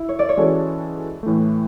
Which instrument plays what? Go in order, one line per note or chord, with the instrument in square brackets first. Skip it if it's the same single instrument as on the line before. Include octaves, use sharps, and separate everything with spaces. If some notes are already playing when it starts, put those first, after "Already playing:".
Already playing: [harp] E4
C#5
D5
C#5
[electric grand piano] E3 G#3 C#4 F#4 A4
A2 E3 A3